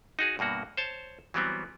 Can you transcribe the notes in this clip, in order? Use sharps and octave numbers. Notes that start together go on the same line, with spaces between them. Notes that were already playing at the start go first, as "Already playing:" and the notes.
D#4 F#4 G#4
G2 B2 A#3 F#4
C5 C#5 A5
E3 F#3 G3 B3 C4